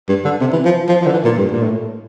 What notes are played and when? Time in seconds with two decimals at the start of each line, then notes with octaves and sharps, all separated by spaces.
0.09 G2
0.25 D3
0.41 C3
0.53 E3
0.65 F3
0.89 F3
1.02 F3
1.07 D3
1.13 E3
1.25 A#2
1.37 G2
1.51 A#2
1.62 A2